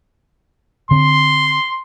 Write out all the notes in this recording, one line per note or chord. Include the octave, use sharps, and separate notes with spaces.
D3 C4 C6